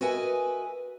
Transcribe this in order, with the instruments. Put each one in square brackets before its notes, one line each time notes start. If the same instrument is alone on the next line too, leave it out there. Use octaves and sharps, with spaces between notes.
[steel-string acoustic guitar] F#4 A#4 B4 D#5 E5 G#5